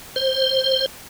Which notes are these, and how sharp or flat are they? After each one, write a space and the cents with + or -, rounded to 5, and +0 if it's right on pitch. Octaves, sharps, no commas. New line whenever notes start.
C5 +15